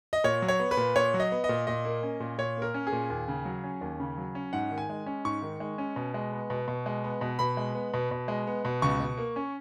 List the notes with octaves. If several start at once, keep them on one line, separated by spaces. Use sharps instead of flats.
D#5
A#2 C#5
F#3
C#5
B3
B4
A#2
A#2 C#5
F#3
D#5
B3
D#5
A#2
A#2 D#5
A#3
C#4
A#2
A#2 C#5
A#3 A#4
C#4
G#4
A#2
D#2
C#3
F#3
C#4
D#2
C#3
F#3
C#4
G#2 F#5
D#3
G#5
G#3
C#4
G#2 C#6
D#3
G#3
C#4
B2
G#3
B3
B2
B2
G#3
B3
B2
B2 B5
G#3
B3
B2
B2
G#3
B3
B2
C#2 C#6
B2
A#3
C#4